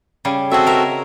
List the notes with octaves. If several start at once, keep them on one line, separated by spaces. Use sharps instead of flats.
C#3 G3 G#5
C4 F#4 G#4 A4 D#5 E5
A#4 E5